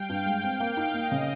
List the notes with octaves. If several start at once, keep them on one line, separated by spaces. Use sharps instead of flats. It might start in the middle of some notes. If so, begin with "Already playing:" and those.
Already playing: G3 F5 G5
G2
G#3 G5
C4
A#3 F5
D#4
A#3 D#5
C#3